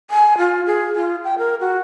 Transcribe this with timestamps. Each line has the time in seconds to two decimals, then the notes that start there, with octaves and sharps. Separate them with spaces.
0.11 G#5
0.38 F4
0.66 G#4
0.96 F4
1.24 G5
1.38 A#4
1.61 F#4